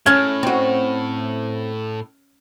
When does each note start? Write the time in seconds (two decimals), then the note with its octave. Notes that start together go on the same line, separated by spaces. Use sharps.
0.06 A2 C#4 A5 F6 G#6
0.43 C4 F#4